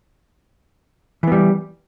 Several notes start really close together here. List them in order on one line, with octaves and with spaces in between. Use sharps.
E3 B3 G3